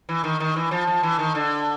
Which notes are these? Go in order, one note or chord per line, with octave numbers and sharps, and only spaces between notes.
E3
D#3
D#3
E3
F3
F3
E3
D#3
D3